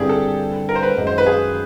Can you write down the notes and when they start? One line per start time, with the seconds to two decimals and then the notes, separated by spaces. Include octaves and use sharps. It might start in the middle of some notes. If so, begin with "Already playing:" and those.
Already playing: G2 D3 G3 C4 E4 G4 G#4
0.09 A4
0.69 A#4
0.75 C5
0.83 B4
0.97 F#2 D#3 G#3
1.07 C5
1.18 B4
1.27 G#4